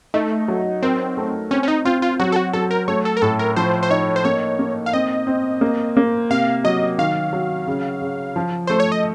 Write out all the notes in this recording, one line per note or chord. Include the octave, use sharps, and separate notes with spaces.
A3 D#4
F#3
C4 A#4
A3
C4 C#4
C#4
D#4
C4 F4
F4
F#3 F#4
A4
F#4
F#3 A4
A#4
A3 C#5
A4
A#4
A2 A4
A#4
F3 C5
C5
D#4 C#5
C5
A#3 C#5
A#3
F5
C4 D#5
C4
A#3
A#3
C3 F5
F#3 D#5
D#3 F5
F#3
C#3
C#3
F3
A3 C5
C#5
D#5